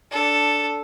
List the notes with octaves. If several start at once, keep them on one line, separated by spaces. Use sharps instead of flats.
D4 A4